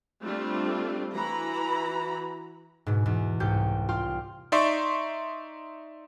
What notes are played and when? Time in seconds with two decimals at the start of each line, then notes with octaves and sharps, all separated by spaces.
0.22 G3 A3 C4 D4 F4
1.14 E3 F#4 A#5 B5
2.86 G#2 B2
3.06 E2 G#2
3.40 C2 G#2 G3 G4 G6 C#7
3.89 F4 G4 G5 C6
4.52 D#4 D5 E5 C6 C#6